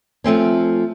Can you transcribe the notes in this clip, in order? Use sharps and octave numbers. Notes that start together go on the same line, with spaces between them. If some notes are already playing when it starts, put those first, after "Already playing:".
F3 A3 C4 C#4